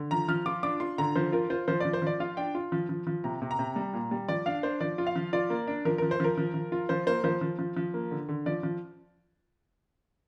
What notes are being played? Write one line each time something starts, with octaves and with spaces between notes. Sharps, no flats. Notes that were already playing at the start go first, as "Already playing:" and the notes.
Already playing: D3
F3 A#5
F3 F6
F4 D6
D4 D6
F4 C6
D3 A#5
F3 C5
F4 A#4
F4 C5
F3 C5
F3 D5
C5
F3 D5
F4 F5
D4 G5
F4
F3
F3
F3
C3 A#5
C3
A#5
C3
G3
A#2
G3
F3 D5
D4 F5
D4 C5
F3 D5
F4
F5
F3
F4 D5
A#3
D4
F3 A#4
F3 A#4
C5
F3 A#4
F3
F3
F4
F3 C5
A#3 C5
F3 C5
F3
F3
F3
A#3
D3
D3
F3 D5
F3